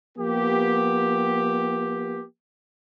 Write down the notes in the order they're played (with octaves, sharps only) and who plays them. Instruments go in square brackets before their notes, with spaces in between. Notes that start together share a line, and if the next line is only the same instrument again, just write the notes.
[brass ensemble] F3 A#3 B3 G4